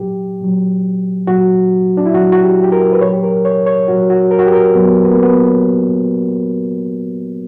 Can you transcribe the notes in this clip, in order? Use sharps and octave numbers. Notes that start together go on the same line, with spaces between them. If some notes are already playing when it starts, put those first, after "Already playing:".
Already playing: A#2 F#3 G4
A#2 F#3
A#2 F#3 F#4
D4
E4
A#2 F#3 F#4
F#4
G4
G4
A#4
B4
A#2 F#3 C#5
G4
A#4
C#5
C#5
A#2 F#3 F#4
F#4
A#4
F#4
G4
A#4
A#2 F#3 B3
B3
A#3
B3